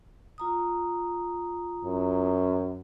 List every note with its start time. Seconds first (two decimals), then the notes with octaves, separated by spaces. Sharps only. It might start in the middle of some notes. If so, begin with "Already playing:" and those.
0.38 F4 A#5 D#6
1.85 F#2